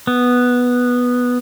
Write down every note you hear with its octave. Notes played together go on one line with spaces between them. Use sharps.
B3